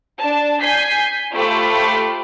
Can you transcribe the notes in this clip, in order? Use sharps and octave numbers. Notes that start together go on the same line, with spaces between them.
D4 A5
G#5 G6 B6 C7
A3 F4 G4 C5 B5 D6